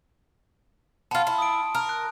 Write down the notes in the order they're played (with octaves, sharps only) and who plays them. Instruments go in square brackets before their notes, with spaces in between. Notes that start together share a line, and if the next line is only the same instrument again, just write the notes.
[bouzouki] B3 F4 [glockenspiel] A5 C6
[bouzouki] E4
[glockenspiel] D#6 D7
[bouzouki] A#4
[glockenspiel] F#6